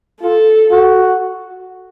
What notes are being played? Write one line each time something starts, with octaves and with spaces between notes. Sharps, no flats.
F4 A4
F#4